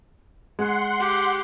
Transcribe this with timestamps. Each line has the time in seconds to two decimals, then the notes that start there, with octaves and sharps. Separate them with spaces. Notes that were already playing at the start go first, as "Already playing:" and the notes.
0.59 G#3 F#5 C6
0.99 G4